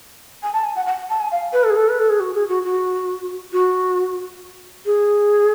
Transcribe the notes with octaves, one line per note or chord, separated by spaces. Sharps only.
G#5
A5
G#5
F#5
F#5
A5
G#5
F5
B4
A4
G#4
A4
B4
A4
G#4
F#4
G#4
F#4
F#4
F#4
G#4